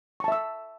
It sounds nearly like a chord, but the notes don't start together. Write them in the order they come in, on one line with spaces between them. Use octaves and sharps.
C#6 A5 E5 E6